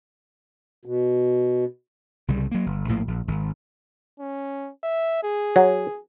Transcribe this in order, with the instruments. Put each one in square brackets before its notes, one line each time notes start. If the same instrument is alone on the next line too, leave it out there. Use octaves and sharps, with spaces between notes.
[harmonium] B2
[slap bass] C2 C#3 G3
F#3 A#3
G1
A#1 A2 A#3
A#1
G#1
[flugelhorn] C#4
E5
G#4
[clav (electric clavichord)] F#3